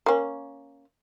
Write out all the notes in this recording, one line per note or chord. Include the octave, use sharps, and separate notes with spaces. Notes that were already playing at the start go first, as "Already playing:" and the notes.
A#3 C#4